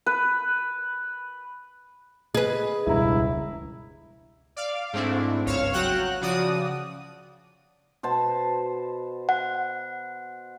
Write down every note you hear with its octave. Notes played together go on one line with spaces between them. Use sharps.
B4
G#4 B4 D#5
E1 C#2 G2 E4 A#5
D5 F5
G#2 A3 C4 D4 E4
G1 C#2 C#5 F5 F6 E7
F#3 F#4 F#5 G5 F#6
C#3 F3 F#4 D5 D#6
B2 C5 A5
F#5